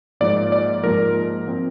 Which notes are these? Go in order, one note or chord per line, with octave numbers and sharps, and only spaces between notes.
G#2 F3 A#3 D5
D5
G#2 F3 A#3 A#4
F3 C4